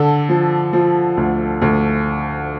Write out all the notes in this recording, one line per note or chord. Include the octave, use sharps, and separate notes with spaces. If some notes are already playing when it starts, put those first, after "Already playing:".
Already playing: D3 A4
F3
F3
D2
D2